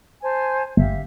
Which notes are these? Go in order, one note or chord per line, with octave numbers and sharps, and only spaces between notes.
C5 G#5 A5
G1 G4 E5 F5